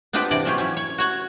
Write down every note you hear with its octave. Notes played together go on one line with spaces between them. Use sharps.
B3 C4 D4 F4 G4 B4
C3 E3 D5
F#3 A3 C#4 F4 G4
C#4 E4
C#5
F#4 C#5 F#5